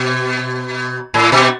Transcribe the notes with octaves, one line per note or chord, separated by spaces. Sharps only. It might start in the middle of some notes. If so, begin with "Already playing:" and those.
Already playing: B2
A2
B2